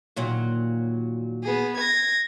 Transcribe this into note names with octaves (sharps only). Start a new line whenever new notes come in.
D#2 A#2 F#3
B3 G#4
G#6 A#6